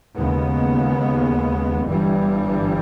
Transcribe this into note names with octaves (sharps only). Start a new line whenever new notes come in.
D#2 C#3 G#3 B3
G1 G2 E3 G3